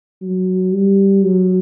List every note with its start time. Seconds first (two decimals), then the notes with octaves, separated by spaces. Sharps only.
0.22 F#3
0.72 G3
1.24 F#3